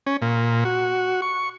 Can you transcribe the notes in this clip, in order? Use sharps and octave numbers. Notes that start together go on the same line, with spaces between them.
C#4
A#2
F#4
C#6